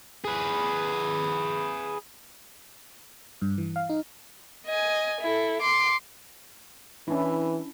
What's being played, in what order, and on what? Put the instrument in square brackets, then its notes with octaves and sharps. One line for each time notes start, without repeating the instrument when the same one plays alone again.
[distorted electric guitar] G#4 B4
[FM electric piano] G2
E3
F5
D#4
[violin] D#5 G#5
E4 A4
C6 D6
[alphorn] E3 [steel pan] C#4 D4 E4